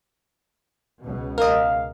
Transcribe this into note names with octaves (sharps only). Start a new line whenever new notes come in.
C#2 B2
A#4 D#5 F5